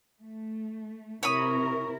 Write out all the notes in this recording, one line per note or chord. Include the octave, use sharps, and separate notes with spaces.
A3
C3 E4 A#4 C#5 B5 D#6